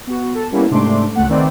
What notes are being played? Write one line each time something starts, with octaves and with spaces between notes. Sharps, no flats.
B3 F#4
A4
G3 A#3 B3 C#4 E4
G#2 C3 A3 D4 C6 D6
C#2 A3 F#5
D#3 A3 C4 B4 D5